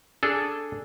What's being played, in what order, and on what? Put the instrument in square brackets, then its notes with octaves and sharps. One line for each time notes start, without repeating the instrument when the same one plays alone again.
[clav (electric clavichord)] D4 G#4 A4